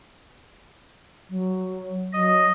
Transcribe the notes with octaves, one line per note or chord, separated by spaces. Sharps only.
F#3
F#3 D#5